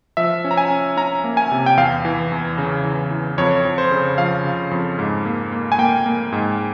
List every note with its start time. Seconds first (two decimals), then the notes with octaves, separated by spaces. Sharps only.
0.17 F3 E5
0.44 C#4
0.51 A#5
0.57 G#5
0.70 C#4
0.97 C#4 A#5
1.24 A#3
1.37 G#5
1.51 C3
1.66 G5
1.77 E2 F5
2.05 E3
2.32 E2
2.58 C#3
2.84 E3
3.11 E3
3.38 F2 C#5
3.65 F2
3.78 C5
3.91 C#3
4.18 F3 F5
4.44 C#3
4.71 F2
4.99 G#2
5.25 A#3
5.52 A#3
5.72 G#5
5.78 A#3 G5
6.06 A#3
6.32 G#2